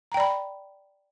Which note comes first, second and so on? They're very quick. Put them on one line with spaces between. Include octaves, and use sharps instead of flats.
A#5 G5 D5 B5